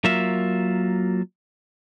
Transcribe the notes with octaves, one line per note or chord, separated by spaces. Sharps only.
F#3 A#3 F4 A#4 E5